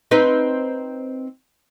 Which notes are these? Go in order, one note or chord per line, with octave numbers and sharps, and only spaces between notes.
C4 D#4 B4